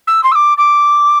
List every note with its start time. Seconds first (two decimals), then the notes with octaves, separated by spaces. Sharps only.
0.07 E6
0.23 C6
0.32 E6
0.35 D6
0.58 D6